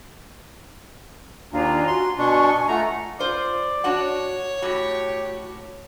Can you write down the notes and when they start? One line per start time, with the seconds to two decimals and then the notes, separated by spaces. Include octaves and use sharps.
1.52 D#2 D4 F4 G#5 A#5
1.87 F#4 C6
2.18 B2 D4 G#5 C6 C#6
2.68 A3 F4 F#5 A#5
3.19 F4 C5 D5
3.84 D4 F#4 C#5 F#5
4.62 A2 F#4 G4